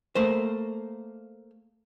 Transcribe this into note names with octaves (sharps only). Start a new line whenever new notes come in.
A3 A#3 C5